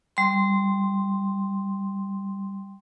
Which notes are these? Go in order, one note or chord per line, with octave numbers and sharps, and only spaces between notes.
G3 C6